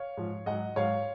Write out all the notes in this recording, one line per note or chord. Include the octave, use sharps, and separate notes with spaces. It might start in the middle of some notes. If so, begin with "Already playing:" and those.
Already playing: C#5 F5
G#2 F3
G#2 F#3 D#5 F#5
G#2 F#3 C#5 F5